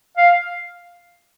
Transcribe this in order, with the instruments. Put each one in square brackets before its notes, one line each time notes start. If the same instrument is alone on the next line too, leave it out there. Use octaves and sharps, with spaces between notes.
[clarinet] F5